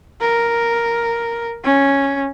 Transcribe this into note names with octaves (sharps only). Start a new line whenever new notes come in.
A#4
C#4